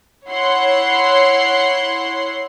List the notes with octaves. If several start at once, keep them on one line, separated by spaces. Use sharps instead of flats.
E4 C#5 F#5 C6 C7